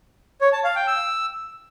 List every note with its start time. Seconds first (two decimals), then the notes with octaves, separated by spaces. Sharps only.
0.41 C#5
0.53 A5
0.64 F5
0.76 G5
0.87 E6